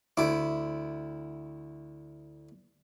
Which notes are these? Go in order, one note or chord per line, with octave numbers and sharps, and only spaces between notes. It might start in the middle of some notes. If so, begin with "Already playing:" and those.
D2 E4 D6